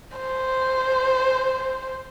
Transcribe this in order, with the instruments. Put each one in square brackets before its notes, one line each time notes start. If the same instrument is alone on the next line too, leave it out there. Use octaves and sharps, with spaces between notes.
[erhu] C5